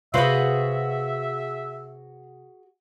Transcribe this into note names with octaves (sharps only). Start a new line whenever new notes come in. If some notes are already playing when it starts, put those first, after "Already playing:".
C3 F#4 G#4 B4 C5 E5 F5